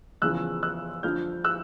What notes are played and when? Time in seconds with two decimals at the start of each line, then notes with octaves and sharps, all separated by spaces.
0.22 E2 C#3 F3 E6 F#6
0.63 E6 F#6
1.03 F2 D3 F3 F6 G6
1.44 E6 F#6